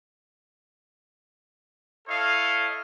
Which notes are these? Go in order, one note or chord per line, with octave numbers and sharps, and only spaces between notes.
E4 A4 C#5 D#5 F5